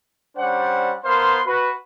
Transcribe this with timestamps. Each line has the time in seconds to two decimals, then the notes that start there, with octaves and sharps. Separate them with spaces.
0.37 G3 C#4 D4 C5 F#5
1.05 B3 A#4 C5 F5 C6
1.45 F#4 B4